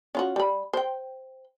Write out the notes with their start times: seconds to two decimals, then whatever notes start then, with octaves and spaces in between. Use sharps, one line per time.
0.15 C#4 F4 F#4
0.36 G3 B5
0.73 C5 G5